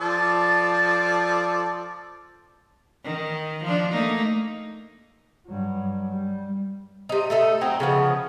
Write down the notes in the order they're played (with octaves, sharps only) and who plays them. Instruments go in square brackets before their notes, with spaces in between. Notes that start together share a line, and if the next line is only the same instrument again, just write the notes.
[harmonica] F3 A4 D5
[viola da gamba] D#3
F3 D4
A3 A#3 D#4
[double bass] G2 F#3
G3
[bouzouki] C3 D#4
A3 D#4 A4
F#3 C4 D#4
C#3 F3 B3